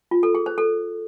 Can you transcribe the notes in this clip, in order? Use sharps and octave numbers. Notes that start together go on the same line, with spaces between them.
F4
A4
G#4
C5
A4